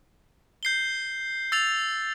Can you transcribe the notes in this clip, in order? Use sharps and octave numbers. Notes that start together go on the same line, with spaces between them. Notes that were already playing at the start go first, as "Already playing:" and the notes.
G6 C7 G7
E6 A6 C7 F7